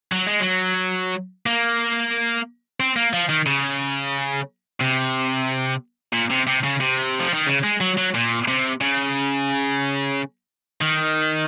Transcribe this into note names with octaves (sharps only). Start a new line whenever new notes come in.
F#3
G#3
F#3
A#3
C4
A#3
F3
D#3
C#3
C3
A#2
C3
C3
C#3
C3
F3
D#3
C#3
G#3
F#3
F#3
A#2
C3
C#3
D#3